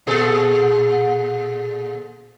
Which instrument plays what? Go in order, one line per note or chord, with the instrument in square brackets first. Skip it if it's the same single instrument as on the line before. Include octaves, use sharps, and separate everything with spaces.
[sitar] A#2 G#4 A4